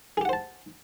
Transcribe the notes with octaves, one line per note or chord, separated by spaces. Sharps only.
G4 G#4 C5 F#5 A5